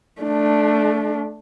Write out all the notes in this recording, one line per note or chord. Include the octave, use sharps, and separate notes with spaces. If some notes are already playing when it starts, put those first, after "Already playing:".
A3 D4